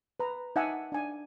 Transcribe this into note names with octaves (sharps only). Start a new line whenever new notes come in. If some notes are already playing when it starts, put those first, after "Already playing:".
B4 A#5
D#4 E5 F#5 G#5 A5 E6
D4 G#5